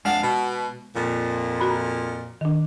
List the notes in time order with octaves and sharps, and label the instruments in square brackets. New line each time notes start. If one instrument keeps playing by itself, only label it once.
[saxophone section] F2 D4 F5 [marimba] G#3 F#5
[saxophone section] B2
F2 A#2
[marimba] F#4 A#5 B5
D#3 D4